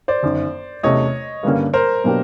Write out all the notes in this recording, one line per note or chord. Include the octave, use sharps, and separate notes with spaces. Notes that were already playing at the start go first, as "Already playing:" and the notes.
C5 D5
G1 F#2 D#3
E2 C3 E3 A3 C#4 C#5 D#5
G2 D3 G3 A#3 C#4
A#4 C5
B2 F#3 A#3 D4 G4